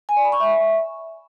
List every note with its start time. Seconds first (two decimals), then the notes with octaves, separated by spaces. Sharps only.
0.09 G#5
0.17 D5
0.24 B5
0.32 C#6
0.40 E5